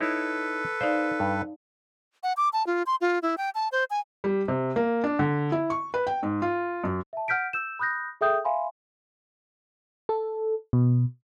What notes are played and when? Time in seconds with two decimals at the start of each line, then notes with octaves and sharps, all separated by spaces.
0.01 D#4 E4 A4 B4 C#5
0.81 D#4 C5 D5 F5
1.20 G2
2.23 F#5
2.37 D6
2.53 A5
2.67 F4
2.86 C6
3.01 F4
3.22 E4
3.38 G5
3.55 A5
3.72 C5
3.90 G#5
4.24 G3
4.48 C3
4.76 A#3
5.04 D4
5.19 D3
5.52 E4
5.70 C#6
5.94 B4
6.07 G5
6.23 G#2
6.42 F4
6.84 F#2
7.13 E5 A5
7.28 F#5 F6 G6 B6 D7
7.53 E6 G6 E7
7.79 B5 D#6 F#6 G6 A#6
8.21 G#4 A4 E5 G5 D#6 G6
8.44 E5 F5 G#5 B5 C6
10.09 A4
10.73 B2